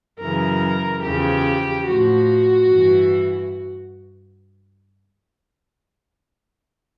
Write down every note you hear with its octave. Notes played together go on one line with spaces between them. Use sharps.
F#2 C#3 E3 A#4
E2 C#3 F3 G4
A2 F3 F#4
G2 E3